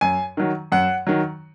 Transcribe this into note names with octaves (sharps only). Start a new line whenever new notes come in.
F#2 G#5
D#3 F#3
F#2 F#5
D#3 F#3